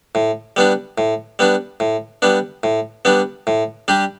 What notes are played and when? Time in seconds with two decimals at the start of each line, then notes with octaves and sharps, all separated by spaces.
0.15 A2
0.56 G3 B3 D4
0.98 A2
1.39 G3 B3 D4
1.80 A2
2.22 G3 B3 D4
2.63 A2
3.05 G3 B3 D4
3.47 A2
3.88 G3 D4 G4